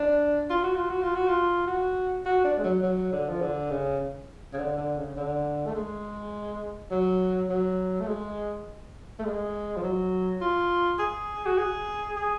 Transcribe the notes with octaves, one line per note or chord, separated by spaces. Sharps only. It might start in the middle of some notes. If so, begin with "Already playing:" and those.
Already playing: D4
F4
F#4
F4
F#4
F4
F#4
F4
F#4
F#4
D4
G#3
F#3
F#3
D3
F3
D3
C#3
C#3
D3
D3
C#3
D3
A3
G#3
F#3
F#3
A3
G#3
A3
G#3
F3
F#3
F4
G#4
F#4
G#4
G#4